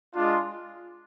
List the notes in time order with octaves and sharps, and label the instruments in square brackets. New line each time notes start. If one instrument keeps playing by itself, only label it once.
[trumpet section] G#3 D4 F4